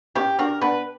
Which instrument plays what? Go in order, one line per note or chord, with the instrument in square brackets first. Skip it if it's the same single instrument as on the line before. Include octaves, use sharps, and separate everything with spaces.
[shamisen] C#4 E4 [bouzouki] G4
[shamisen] D4 F#4 [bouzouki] A#4
[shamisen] B3 D4 [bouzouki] B4